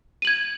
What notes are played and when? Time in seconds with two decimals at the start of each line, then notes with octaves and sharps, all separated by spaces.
0.22 D#7
0.25 F#7
0.27 G#6